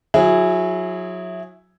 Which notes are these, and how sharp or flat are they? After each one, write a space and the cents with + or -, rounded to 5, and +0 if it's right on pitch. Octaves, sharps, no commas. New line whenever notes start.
F#3 -25 E4 +0 G#4 +0